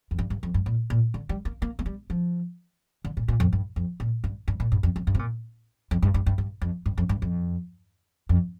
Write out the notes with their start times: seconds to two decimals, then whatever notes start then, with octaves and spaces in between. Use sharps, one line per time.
0.11 F2
0.18 G2
0.30 G2
0.43 F2
0.54 G2
0.66 A#2
0.90 A#2
1.14 D3
1.29 G3
1.45 A#3
1.62 A#3
1.79 A#3
1.86 G3
2.10 F3
3.05 D3
3.17 A#2
3.28 A#2
3.40 F2
3.53 G2
3.76 F2
4.00 A#2
4.24 G2
4.48 G2
4.60 A#2
4.72 G2
4.83 F2
4.96 F2
5.07 G2
5.15 C3
5.19 A#2
5.91 F2
6.02 G2
6.14 G2
6.26 G2
6.38 G2
6.62 F2
6.86 G2
6.98 F2
7.09 G2
7.22 F2
8.29 F2